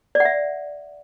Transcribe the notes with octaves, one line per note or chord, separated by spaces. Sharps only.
D5
F#5
E5